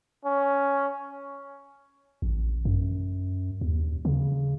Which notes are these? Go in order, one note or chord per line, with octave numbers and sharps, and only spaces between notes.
C#4
A1
F#2
D#2
C#3